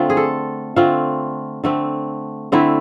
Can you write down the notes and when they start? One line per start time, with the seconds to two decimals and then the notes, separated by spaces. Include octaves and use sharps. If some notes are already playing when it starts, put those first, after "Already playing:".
Already playing: D3 A3 C4 F4
0.10 G#4
0.17 A4
0.76 D3 A3 C4 F4
1.64 D3 A3 C4
2.52 D3 A3 C4 E4